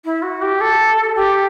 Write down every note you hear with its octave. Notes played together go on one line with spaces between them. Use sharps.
E4
F#4
G4
A4
G4